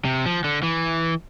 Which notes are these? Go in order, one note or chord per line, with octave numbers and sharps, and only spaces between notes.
C3
F3
D3
E3